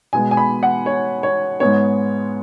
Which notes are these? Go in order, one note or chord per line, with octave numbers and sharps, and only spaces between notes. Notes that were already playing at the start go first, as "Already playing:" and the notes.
B2 G#3 B3 G#5
G#5
B5
F#5
C#5
C#5
G#2 G#3 B3 C#5